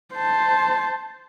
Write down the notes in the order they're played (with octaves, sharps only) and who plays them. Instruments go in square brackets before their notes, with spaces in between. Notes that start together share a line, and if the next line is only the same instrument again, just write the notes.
[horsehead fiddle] C5 A5